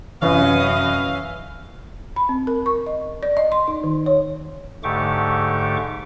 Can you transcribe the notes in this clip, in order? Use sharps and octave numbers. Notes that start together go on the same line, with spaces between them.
F#2 C3 E3 C#4 E4 B4 D#5 F5
B5
C4
A#4
C#6
D#5
D5
D#5
C6
D#4
D#3
C#5
G#2 D3 A3 G4 C#6 D6